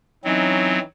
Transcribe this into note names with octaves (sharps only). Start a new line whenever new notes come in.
E3 F#3 C4 C#4 D#4